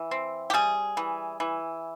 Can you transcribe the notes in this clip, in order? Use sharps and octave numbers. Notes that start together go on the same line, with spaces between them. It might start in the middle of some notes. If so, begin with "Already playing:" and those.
Already playing: E3
C4
G4
G3 G#4
E3
E3